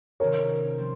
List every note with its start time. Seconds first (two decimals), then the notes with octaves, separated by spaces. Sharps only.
0.20 C3 D#3 A#3 C#4 F#4 A#4 C#5
0.78 F3 C4